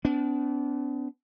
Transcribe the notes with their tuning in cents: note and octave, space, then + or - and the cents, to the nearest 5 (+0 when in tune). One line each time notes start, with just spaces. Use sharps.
B3 +40 D4 -30